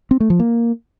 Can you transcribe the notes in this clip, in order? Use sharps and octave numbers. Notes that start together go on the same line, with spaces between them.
C4
A3
F3
A#3